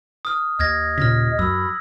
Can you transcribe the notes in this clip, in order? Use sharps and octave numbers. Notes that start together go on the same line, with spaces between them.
D#6 F6
D#2 D#5 F6 G#6 A#6
A#2 C#3 F6 A#6 B6
F#2 B5 E6